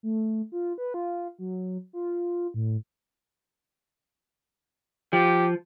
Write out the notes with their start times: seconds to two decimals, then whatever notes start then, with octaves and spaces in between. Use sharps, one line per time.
0.03 A3
0.52 F4
0.78 B4
0.94 F4
1.39 F#3
1.93 F4
2.54 A2
5.13 F3 G4